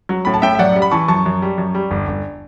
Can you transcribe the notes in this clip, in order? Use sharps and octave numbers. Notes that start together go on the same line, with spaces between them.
F#3
A2 B5
A5
A2 E5 G5
E5
F#2 D5 F#5
G3
B5
E3 A5 C#6
F#2 A5 C#6
F#2
G3
F#2
G3
G1
G1